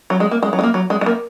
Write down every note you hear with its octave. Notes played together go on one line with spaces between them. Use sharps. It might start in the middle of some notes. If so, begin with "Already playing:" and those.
F#3
G#3
A#3
G#3
F#3
G#3
A#3
F#3
G#3
G#3
A#3